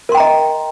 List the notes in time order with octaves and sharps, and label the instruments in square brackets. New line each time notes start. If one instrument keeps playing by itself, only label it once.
[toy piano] A#4
C6
G5
A#5
D#5